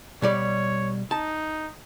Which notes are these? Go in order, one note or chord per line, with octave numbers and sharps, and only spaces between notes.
B2 G3 C#5 D5
D#4 A5